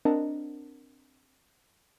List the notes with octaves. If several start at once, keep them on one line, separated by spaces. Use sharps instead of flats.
C4 D4 A#4 D#5 F#5 A5